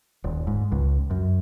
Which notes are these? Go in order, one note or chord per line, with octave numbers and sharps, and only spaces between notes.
D#1
G#2
C#2
F#2